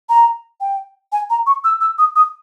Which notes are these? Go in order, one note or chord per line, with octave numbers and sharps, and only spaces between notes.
A#5
G5
G#5
A#5
C#6
E6
E6
D#6
D#6